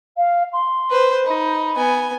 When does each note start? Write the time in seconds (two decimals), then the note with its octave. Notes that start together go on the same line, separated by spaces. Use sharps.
0.17 F5
0.52 C6
0.90 B4 C5
1.26 D#4 B5
1.76 B3 G#5